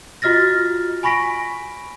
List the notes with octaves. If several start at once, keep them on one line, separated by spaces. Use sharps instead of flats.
F4 F#4 D#5 F6 A6 A#6
G#5 B5 C#6 A#6 B6 D7